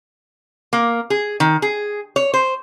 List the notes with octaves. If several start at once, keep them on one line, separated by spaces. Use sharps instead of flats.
A#3
G#4
D#3
G#4
C#5
C5